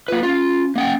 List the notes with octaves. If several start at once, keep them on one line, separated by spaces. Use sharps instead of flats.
A#3 F4 B4
C#4 F4
A#3 C#4 F#5 G5